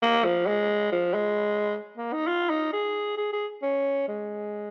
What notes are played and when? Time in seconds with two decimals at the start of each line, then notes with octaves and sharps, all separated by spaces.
0.02 A#3
0.24 F3
0.47 G#3
0.92 F3
1.14 G#3
1.97 A#3
2.13 D#4
2.27 F4
2.50 D#4
2.73 G#4
3.17 G#4
3.33 G#4
3.63 C#4
4.08 G#3